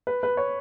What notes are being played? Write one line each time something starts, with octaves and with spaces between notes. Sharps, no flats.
B4
B4
C#5